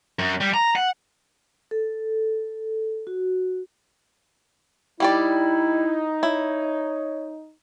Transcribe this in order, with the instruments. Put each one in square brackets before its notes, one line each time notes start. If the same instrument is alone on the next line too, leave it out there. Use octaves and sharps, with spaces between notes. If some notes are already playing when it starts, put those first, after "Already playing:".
[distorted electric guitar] F#2
G3
A#5
F#5
[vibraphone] A4
F#4
[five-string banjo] G3 G4 D5 [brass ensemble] D#4 [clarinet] E4
[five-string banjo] E4 [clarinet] C#5